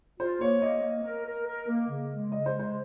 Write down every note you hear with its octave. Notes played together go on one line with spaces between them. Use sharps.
F4 C5
A#3 C#5
A#3 D#5
A#3
A#4
A#4
A#4
A#3
C#3
G#3
C#3 D#5
C5
G#3
C5